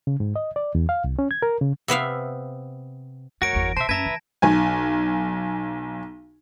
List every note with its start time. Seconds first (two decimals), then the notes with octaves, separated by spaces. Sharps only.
0.07 C#3
0.20 G#2
0.36 D#5
0.56 D5
0.75 E2
0.89 F5
1.04 C2
1.19 C#4
1.31 G#6
1.42 A#4
1.61 C#3
1.88 C3 B3 E5 F5
3.42 F#2 F#4 A#4 C#5 A#6 D7
3.53 G1 E2
3.77 B2 C5 E5 A5
3.89 F#2 C#4 B4 E5 A#5 G#6 A#6
4.06 E3
4.42 B1 G#5